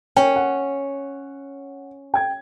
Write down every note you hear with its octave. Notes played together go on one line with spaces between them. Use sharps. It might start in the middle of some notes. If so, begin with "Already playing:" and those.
C#4 G5
F#5
G5 G#6